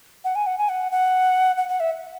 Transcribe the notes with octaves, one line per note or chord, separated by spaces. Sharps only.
F#5
G#5
F#5
G#5
F#5
F#5
F#5
F#5
E5